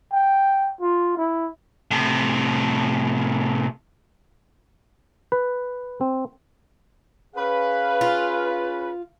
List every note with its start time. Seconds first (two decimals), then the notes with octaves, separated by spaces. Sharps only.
0.12 G5
0.81 F4
1.18 E4
1.91 A2 C3
5.32 B4
6.01 C4
7.36 C#4 G#4 B4 F5
8.01 F4